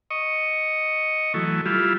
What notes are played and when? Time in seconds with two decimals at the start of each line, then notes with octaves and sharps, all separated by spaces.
0.11 D#5 C#6
1.34 E3 F#3 A3
1.66 G3 E4 F4